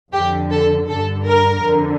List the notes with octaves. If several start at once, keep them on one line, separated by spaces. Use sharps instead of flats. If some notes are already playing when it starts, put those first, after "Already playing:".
F2 D3 G4
A4
G2 D3 A4
A#4
F2 D3